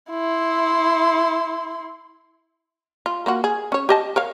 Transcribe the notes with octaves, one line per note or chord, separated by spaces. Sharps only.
E4 C6
F4
A#3 F4 F#4
G#4
C#4 C#5
G4 D#5 A5
A#4 C#5 F5